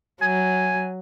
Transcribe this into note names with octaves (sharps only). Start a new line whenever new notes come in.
F#3 G#5